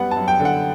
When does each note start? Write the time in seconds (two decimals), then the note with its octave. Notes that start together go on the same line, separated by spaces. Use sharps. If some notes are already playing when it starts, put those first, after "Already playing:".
Already playing: F#2 G3 B3 F#5
0.11 A5
0.17 F#2
0.28 G5
0.40 D3
0.45 F#5